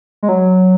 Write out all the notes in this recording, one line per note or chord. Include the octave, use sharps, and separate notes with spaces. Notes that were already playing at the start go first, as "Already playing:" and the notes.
G#3
F#3